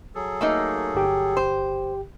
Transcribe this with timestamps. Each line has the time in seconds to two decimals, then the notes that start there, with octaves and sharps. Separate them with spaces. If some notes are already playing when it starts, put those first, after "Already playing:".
0.15 F#3 G#4 A4
0.41 A3 A#3 D#4
0.95 G1 G4 G5
1.37 C5